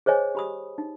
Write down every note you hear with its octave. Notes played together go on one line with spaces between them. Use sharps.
G#4 C5 C#5 D#5 G#5
G4 B5 D#6
D#4